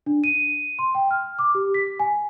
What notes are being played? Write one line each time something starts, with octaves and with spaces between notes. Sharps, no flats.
D4
D#7
C6
G5
F6
D6
G4
B6
G#5